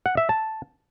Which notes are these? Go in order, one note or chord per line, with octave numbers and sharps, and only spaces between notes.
F#5
E5
A5